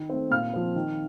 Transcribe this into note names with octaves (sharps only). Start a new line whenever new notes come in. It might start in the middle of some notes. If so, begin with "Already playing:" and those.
Already playing: D#3
A3 C4
A#2 F5 F6
F3 C4
D#3